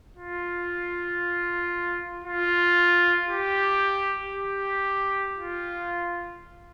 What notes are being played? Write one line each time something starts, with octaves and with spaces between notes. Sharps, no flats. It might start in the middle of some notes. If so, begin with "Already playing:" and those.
F4
F4
G4
G4
F4